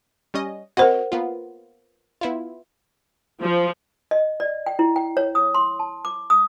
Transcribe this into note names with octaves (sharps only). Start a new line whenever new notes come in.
G3 C#4 D#5
C4 F#4 A#4 C5 D#5 F#5
A#3 B3 F4
B3 E4 F4
F3
D#5
D5
G5
E4
G5
C#5
D#6
C6
A5
D6
D#6